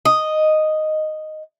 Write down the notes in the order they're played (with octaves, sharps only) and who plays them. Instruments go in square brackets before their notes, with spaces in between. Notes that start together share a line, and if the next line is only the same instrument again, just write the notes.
[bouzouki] D#5